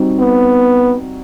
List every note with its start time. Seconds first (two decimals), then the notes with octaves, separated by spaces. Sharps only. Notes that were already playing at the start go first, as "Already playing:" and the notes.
Already playing: G3 C4 D#4 F#4
0.20 B3